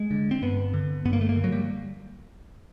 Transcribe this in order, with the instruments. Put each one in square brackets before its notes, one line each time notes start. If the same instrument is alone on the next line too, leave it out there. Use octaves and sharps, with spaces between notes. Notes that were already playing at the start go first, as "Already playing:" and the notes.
Already playing: [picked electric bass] G#3
D3
C4
G2 B3
D3
G2 B3
A#3
A3
A#3
D3
F#3
G3